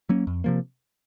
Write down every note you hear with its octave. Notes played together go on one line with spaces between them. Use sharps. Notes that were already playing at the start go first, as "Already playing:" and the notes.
F#3 A#3 C#4
F2
C3 F3 A#3